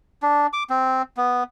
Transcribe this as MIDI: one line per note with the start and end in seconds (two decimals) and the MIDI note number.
0.22 0.47 62
0.53 0.63 86
0.70 1.02 60
1.17 1.43 59